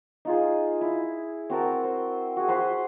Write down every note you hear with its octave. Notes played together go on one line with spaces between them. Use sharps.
D#4 F4 G#4
E4
C4 F#4 A#4 A5
C5
F#4 G#4
F#4 C5 B5 C6